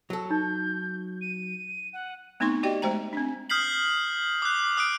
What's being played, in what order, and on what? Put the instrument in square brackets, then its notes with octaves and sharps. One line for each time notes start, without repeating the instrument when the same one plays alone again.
[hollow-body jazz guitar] F#3 A4
[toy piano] D#4 [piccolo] G6
[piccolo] D#7
F#5
[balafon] A3 B3 C4 D#4 C6 C#6
F#4 G4 D5 D#5 G5
G#3 A3 C5 G5 A#5
C4 D4
[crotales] D#6 F6 G6 B6 C7 F#7
D6 F#6
D#6 F6 F#6 D7